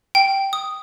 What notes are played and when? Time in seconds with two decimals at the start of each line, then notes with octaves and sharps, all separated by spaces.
0.15 G5
0.53 D#6